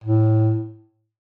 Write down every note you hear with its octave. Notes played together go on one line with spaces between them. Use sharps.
A2